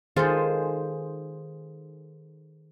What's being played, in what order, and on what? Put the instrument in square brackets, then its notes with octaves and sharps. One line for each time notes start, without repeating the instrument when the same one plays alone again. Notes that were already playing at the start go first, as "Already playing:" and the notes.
[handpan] D#3 G#4 C5 [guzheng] F4 A4